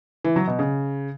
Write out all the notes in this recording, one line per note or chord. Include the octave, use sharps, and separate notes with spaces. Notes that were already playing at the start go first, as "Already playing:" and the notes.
E3
F#3
B2
C#3